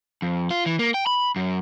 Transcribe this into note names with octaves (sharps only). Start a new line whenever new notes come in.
F2
F4
E3
A#3
G5
B5
F#2